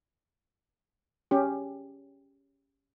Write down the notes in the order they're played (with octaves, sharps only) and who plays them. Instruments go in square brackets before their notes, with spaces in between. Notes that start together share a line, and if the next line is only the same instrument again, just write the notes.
[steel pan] C#4 G4